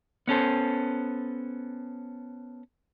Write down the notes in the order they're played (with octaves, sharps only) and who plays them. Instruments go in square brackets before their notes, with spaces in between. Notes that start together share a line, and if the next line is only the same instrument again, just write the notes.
[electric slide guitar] B3 C#4 A4 C5